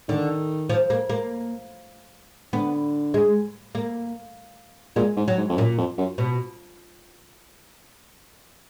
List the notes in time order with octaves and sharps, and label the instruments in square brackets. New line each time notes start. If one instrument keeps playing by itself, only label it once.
[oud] D3 [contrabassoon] D#3
[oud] F3
A#3
A#3
[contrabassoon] D3 [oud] B3
[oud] G#3
A#3
[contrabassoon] A#2 [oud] G#3
[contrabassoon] G#2
[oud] F#3
[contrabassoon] G#2
F2
[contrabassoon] F#2 [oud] A#2
[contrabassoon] F2
F#2
[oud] B2